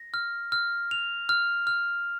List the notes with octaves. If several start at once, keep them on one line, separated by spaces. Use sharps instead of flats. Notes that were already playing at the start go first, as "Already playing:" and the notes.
Already playing: A#6
F6
F6
F7
F6
F6